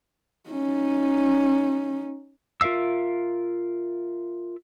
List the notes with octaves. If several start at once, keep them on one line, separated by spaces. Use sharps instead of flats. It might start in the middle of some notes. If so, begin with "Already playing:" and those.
C#4 D#4
F4 A#4 E5 F5 E6